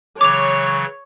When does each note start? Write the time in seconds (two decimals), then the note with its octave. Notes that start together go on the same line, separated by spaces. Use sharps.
0.21 C#3 E3 F#3 C#5 D6 F7